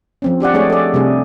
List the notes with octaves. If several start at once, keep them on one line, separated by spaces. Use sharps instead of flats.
F3 C4 C#4
D4 G4 D5 F#5
G#3 A3 D4 G#4 C#5 D5
A4 D5
C3 G3 A3 D4 G#4